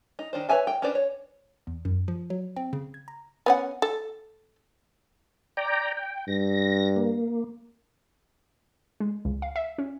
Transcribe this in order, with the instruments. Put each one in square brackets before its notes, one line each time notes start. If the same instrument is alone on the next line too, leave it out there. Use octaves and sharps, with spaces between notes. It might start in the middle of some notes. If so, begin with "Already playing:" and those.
[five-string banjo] D#4
D#3 D4 C5
B4 C#5 E5 G#5 A5
G5
C#4 D4 B4 C5 D5
C#5
[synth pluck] E2
F#2
F3
F#3
C4
C#3
G#6
A#5
[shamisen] B3 C#4 F#5
A4
[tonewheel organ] D5 G5 A#5
G5
[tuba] G2 [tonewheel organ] A#6
[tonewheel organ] A#3
[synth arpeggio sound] G#3
C#2
F5
E5
C#4